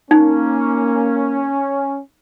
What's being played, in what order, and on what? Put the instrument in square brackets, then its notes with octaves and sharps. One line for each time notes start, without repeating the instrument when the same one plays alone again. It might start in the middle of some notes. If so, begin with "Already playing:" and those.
[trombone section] A#3 [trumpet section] C#4 [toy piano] D#4